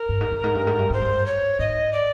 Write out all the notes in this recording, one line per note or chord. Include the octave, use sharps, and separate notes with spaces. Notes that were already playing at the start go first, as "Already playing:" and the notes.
Already playing: A#4
G2
G#2
G2
G#2
G2
G#2
G2
G#2 C5
G2
C#5
G#2 D#5
D5